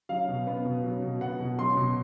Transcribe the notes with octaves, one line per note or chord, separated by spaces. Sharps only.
F#3 F5
B2
B3
B2
F#3
B2
B3 F#5
B2
F#3 C6
B2